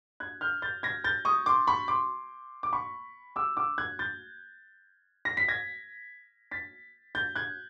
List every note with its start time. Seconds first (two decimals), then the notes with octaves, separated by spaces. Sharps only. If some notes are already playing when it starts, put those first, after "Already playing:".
0.20 F#6 G#6
0.41 F6 G6
0.62 G6 A6
0.83 G#6 A#6
1.04 G6 A6
1.25 C#6 D#6
1.46 C6 D6
1.67 B5 C#6
1.88 C6 D6
2.63 D6
2.73 B5 C#6
3.36 D6 E6
3.57 D6 E6
3.78 F#6 G#6
3.99 G6 A6
5.25 A#6
5.37 B6
5.48 G#6 A#6
6.51 A6 B6
7.15 G6 A6
7.35 F#6 G#6